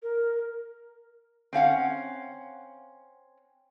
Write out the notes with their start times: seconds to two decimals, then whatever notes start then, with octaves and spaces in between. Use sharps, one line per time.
0.03 A#4
1.53 C4 C#4 F5 F#5